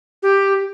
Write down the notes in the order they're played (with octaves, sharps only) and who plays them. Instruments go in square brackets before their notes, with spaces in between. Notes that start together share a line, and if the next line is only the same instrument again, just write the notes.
[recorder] G4